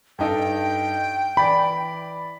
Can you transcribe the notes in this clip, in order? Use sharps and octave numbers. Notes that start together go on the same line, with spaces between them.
G2 D#4 A4 G5
E3 D5 B5